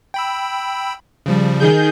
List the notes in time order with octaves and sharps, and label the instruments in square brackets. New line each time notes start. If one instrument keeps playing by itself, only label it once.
[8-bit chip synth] G5 B5 E6
C#3 F3 G3
[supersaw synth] D#3 G#4 G6